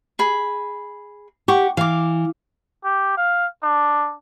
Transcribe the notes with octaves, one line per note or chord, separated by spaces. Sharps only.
G#4 B5
G4 F#5 C#6 D6
E3 F5 D6
G4
F5
D4